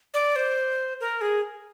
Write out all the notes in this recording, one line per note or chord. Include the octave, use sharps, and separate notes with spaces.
D5
C5
A#4
G#4